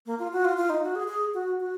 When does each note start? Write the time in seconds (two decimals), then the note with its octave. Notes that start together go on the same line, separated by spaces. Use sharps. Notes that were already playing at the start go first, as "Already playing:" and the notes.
0.06 A#3
0.19 F4
0.33 F#4
0.45 F4
0.57 F4
0.70 D#4
0.83 F#4
0.95 G#4
1.08 G#4
1.34 F#4
1.60 F#4